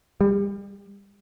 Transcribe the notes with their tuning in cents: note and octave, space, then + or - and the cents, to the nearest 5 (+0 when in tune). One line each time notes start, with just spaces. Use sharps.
G3 +30